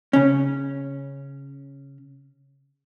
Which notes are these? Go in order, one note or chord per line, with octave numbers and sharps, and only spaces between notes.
C#3 C#4